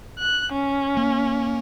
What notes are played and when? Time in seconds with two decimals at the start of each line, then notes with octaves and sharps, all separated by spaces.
0.19 F#6
0.52 C#4
0.97 A#3